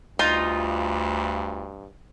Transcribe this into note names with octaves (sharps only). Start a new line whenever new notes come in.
D2 G2 D#4 F4